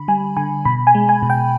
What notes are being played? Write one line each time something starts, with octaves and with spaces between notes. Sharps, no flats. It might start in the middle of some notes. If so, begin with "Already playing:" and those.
Already playing: D3 B5
G3 G#5
D3 G#5
B2 B5
G#5
G#3
G#5
B2
G5